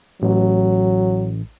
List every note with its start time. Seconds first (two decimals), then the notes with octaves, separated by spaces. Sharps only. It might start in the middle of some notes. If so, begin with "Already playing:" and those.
0.22 A1 F#3